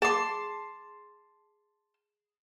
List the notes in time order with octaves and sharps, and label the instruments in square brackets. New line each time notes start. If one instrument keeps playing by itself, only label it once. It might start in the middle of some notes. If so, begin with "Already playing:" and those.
[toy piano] G#4 D6 [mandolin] A5 C6